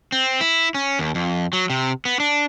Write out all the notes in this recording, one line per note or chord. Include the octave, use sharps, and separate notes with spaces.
C4
E4
C#4
D#2
F2
F#3
C3
B3
D4